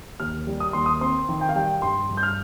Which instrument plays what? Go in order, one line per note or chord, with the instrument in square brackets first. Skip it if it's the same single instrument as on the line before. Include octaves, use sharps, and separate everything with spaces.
[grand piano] D#2 F6
G3
D#6
D#2 C6
D#6
C4 C6
D#3
G5
F5
G3 G5
G2 C6
G2
G6
F6